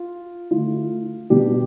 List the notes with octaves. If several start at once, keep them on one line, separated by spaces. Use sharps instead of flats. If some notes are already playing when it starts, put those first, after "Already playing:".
Already playing: F4
D3 A3 E4 F4
B2 B3 D4 G4